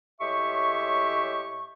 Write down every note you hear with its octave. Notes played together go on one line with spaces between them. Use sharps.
A2 G#3 G4 C#5 E5 C#6